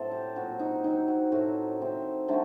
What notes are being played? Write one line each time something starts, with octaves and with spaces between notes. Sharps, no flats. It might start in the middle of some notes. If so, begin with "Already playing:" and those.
Already playing: A2 F#3 A3 C4 A4 C5
G4
A#2 F#3 C4 F#4
D#4
D#3 F#3 C4 D#4
F#4
A2 F#3 A3 C4 F#4
D#3 A3 C4
D3 F#3 A3 C4